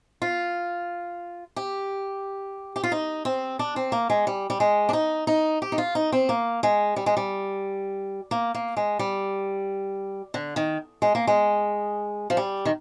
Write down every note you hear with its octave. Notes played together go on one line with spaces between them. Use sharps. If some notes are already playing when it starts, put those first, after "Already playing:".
F4
G4
G4
F4
D#4
C4
D4
C4
A#3
G#3
G3
G3
G#3
D4
D#4
D#4
G4
D#4
F4
D#4
C4
A#3
G#3
G3
G#3
G3
A#3
A#3
G#3
G3
D3
D#3
G#3
A#3
G#3
F3
G3
D#3